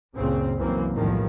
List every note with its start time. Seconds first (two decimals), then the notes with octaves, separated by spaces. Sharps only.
0.14 F#1 C#2 A#2 C#3 C4
0.57 C2 F#2 E3 A#3 C4
0.94 B1 E2 A2 D#3 F3 G3